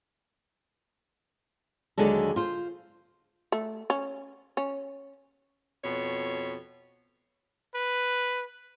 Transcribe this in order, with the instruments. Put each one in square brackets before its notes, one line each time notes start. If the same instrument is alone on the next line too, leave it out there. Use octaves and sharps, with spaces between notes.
[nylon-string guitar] D#2 D3 F#3 G#3 A4
F4 C5
[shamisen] A3
C#4
C#4
[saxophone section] F2 B2 C#5
[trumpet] B4